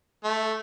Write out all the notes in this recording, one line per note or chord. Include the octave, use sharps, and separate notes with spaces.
A3